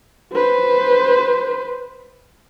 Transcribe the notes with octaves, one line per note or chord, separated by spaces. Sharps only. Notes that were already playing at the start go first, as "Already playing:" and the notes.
B4 C5